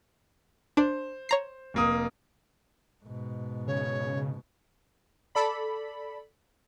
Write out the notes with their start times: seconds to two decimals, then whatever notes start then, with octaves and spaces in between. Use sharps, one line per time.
0.77 D4 C5
1.29 C#5 A#5 C7
1.74 F1 A#3 D#6
3.04 G#2 B2
3.67 C#3 C#5
5.35 A4 D5 B5